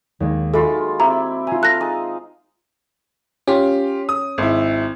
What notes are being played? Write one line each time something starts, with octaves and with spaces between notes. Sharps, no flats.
D#2 G#3
G#3 F4 F#4 A4 B5 D6
C4 E4 G4 A#5
F4 G#5 A#5
A4 F5 F#6 A#6
G#3 D#4 D#5
C#4 F4 G4
D#6
G#1 E4